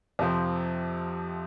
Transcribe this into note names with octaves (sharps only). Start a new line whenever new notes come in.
F2 C3 F3 C4